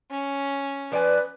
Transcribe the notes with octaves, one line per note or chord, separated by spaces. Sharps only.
C#4
F3 B4 D5 G#5